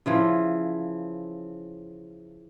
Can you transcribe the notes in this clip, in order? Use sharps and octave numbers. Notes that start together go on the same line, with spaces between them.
C#3 E3 F3